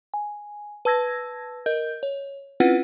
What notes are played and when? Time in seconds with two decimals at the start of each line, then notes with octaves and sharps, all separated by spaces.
0.14 G#5
0.85 B4 A5 E6 G#6 A#6
1.66 A#4 D#5 G6
2.03 C#5
2.60 C4 C#4 E4 F4 B4 F#5